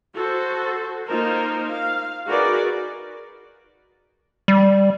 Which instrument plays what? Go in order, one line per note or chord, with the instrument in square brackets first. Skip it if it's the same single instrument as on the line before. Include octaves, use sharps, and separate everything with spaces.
[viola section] F#4 A4 C5
A#3 D#4 F4 A#4 C5
F5
D#4 F#4 G#4 A#4 B4 D5
[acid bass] G3